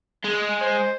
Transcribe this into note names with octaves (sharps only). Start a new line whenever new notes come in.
G#3
C5